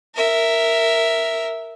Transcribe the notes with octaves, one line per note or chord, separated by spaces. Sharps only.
A#4 E5